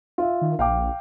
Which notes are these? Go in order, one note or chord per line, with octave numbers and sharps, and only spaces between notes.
F4 E5
D#3
A#1 F5 G5 D6